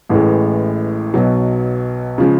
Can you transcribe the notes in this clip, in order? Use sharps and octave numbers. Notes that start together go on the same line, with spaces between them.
A1 A2 E3 G#3
B1 B2 F#3
C#3 F3 G#3